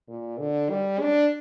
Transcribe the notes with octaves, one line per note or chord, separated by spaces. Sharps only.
A#2
D3
G3
D4